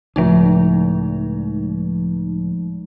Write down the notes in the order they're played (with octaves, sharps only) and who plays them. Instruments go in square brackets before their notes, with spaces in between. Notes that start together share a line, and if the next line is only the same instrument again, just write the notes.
[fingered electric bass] C#2 A2 [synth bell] F3 G#3 D#4